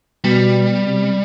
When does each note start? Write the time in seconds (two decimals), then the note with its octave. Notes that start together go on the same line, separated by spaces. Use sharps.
0.24 B2 G3
0.86 C3